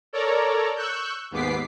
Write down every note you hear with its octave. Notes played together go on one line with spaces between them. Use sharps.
A4 A#4 C#5 D5 A#5
C#6 E6 F#6 G6
D#2 G#2 B3 D6 B6 C7